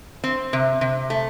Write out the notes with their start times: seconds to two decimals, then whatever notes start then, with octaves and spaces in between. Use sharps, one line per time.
0.24 C4
0.53 C3
0.81 C3
1.10 A3